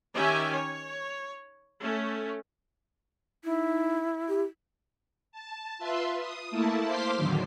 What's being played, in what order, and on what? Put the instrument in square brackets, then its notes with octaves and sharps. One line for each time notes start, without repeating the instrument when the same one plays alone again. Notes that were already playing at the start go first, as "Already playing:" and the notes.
[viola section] D#3 C#4 G4 E5 G#5
C#5
A3 C#4
[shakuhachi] D#4 [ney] E4
[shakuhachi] G4
[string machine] A5
F4 B4 E5 C6
D#6
A3 A#3 E4 A5
C5 F5 C6 D6 B6 C7
E2 A2 D3 D#3 F#3